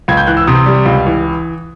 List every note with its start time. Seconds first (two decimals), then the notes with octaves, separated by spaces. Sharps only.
0.08 C#2 G#6
0.17 G6
0.27 E3 F#6
0.37 E6
0.47 C3 D#6
0.66 G3
0.86 C#2
1.06 E3